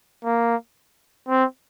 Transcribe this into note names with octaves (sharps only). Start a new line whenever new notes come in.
A#3
C4